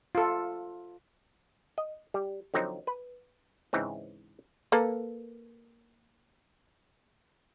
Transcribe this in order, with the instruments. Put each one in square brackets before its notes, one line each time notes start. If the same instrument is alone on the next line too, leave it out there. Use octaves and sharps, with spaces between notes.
[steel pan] F4 A4
[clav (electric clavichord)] D#5
G3
D3 F3 F#3 C4 D#4
B4
G#2 C#3 E3 G#3 C4
[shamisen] A#3 A4 B4